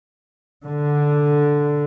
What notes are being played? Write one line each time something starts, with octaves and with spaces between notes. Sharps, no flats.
D3